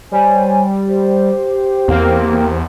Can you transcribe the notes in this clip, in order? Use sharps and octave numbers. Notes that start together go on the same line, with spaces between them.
G3 C5 C#5 G#5
G4 C5
E2 A#3 C4